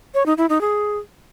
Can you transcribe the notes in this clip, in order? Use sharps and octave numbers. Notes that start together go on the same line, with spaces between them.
C#5
D#4
E4
D#4
G#4